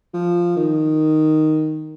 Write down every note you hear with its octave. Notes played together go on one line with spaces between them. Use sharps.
F3
D#3